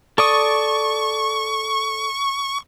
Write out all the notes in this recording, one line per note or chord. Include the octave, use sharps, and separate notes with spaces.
A4 D5 C#6 D#6